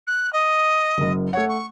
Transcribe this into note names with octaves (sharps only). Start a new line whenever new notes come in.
F#6
D#5
F#1 F#2
A3 C#5 F#5
C#6